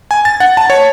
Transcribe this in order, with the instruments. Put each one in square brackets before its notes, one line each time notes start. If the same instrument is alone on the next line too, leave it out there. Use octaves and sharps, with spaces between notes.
[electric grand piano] G#5
A6
F#5
A5
C#5